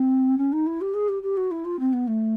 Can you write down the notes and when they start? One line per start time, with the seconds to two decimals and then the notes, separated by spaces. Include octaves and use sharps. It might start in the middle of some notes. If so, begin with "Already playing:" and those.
Already playing: C4
0.37 C#4
0.52 D#4
0.66 E4
0.81 G4
0.94 G#4
1.08 G4
1.22 G4
1.37 F#4
1.51 E4
1.64 F4
1.79 C4
1.93 B3
2.07 A3